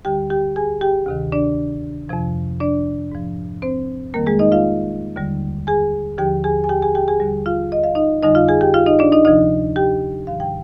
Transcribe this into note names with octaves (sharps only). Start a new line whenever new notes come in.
D2 D3 G3 G4 G5
G4 G5
G#4 G#5
G4 G5
D2 C3 D#3
D4 D5
F2 C3 F3
D4 D5
G#2 F3
C4 C5
F2 D#3 G3 A#3 A#4
G#3 G#4
D#4 D#5
F4 F5
D#2 D3 G3
G#4 G#5
D#2 D3 F3 G4 G5
G#4 G#5
G#5
G4 G5
G#4 G#5
G4 G5
G#4 G#5
D#2 D3 G3
F4 F5
D#5
F5
D#4 D#5
F2 D3 G3 D#4 D#5
F4 F5
G#4 G#5
G4 G5
F4 F5
D#4 D#5
D4 D5
D#4 D#5
D2 C3 F3 D#4 D#5
G4 G5
G#2 D#3 G3 F5
G5